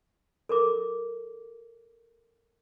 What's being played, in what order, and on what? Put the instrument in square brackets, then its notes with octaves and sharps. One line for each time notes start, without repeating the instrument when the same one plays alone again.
[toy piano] A4 A#4 D6